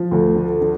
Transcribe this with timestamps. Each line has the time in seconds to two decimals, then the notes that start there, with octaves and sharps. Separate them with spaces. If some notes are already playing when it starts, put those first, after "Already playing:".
Already playing: F3
0.11 D2
0.35 D3
0.61 D3